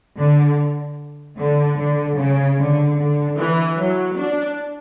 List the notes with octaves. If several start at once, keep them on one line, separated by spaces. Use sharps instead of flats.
D3
D3
D3
C#3
D3
D3
E3
F#3
D4